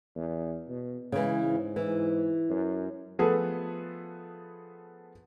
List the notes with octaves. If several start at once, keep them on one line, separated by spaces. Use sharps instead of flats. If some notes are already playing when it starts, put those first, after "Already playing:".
E2
B2
C#3 E3 G#3
G#2
E3
F#2
F3 A3 B3 G#4 A4 B4